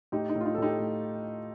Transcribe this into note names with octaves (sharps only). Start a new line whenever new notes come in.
A2 D#4 G4
D#4
A2
F4
D#4
A4
A2 D#4 G4
A2